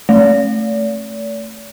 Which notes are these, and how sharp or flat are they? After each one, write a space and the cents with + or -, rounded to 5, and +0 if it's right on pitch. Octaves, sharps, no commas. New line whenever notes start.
A3 +0 D5 -45